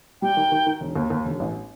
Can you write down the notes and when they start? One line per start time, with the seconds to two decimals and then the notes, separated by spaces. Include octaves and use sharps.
0.22 G3 G5
0.37 D#3
0.52 D#3
0.67 D#3
0.81 E1
0.96 D#2
1.10 D#2
1.25 E1
1.40 A1